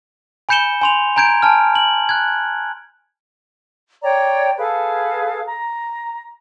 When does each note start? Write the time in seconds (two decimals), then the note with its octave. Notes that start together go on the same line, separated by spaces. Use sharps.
0.49 G#5 B5 G6 C#7 E7 G7
0.81 G#5 C6 F7
1.16 G#5 A#5 G6 G#6 D7
1.42 G#5 A5 F6
1.75 F#7
2.09 F#6 G#6
4.03 C#5 D5 G5 A#5
4.58 G#4 A4 B4 F5
5.46 A#5